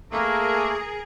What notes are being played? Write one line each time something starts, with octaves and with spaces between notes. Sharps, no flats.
A3 A#3 G#4 A#4